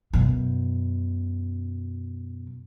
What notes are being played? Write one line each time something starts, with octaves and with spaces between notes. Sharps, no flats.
F#2 B2